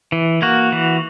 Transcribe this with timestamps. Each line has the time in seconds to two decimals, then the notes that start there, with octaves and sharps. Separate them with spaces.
0.12 E3
0.42 A#3 F#4
0.72 E3